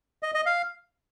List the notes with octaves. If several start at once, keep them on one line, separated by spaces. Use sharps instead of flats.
D#5
D#5
F5